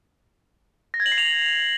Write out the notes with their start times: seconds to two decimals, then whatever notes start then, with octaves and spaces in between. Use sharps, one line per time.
0.94 A#6
1.00 G#6
1.06 F#7
1.12 C7
1.18 F7